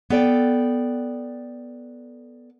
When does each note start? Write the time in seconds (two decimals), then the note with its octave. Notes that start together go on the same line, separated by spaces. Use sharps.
0.10 B3 A4 D5 G5